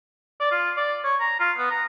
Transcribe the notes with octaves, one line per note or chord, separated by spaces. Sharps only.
D5
F4
D5
C#5
A#5
F4
B3
A#5